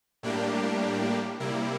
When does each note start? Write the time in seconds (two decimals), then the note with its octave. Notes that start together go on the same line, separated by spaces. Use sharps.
0.23 A2 G3 A#3 D4 G4
1.40 C3 G3 A#3 E4